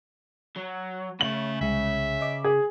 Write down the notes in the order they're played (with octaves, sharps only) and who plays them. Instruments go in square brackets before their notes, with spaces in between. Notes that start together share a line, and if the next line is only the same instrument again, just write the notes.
[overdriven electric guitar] F#3
[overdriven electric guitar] C#3 [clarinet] A3 [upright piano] F#7
[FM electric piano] C2 G#3 [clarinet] E5
[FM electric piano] D#5 D6 B6
[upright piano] G#4